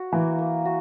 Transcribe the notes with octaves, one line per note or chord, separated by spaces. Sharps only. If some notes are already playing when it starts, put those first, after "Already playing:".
Already playing: F#4
E3 A#3
A#3
F#4